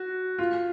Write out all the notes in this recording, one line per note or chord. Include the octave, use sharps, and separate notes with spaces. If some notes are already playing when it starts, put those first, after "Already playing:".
Already playing: F#4
F4